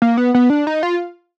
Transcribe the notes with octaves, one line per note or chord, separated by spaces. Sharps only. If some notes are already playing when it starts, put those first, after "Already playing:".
A#3
B3
B3
D4
D#4
F4